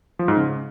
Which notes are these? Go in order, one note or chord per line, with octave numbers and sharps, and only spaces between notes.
F3
G#2
C#3